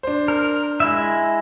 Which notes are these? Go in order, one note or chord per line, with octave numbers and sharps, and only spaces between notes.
D4 C5
A#4
G#3 E4 E5